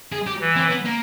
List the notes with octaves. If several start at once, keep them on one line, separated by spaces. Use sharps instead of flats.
G#4
G4
E3
C4
B3
A#3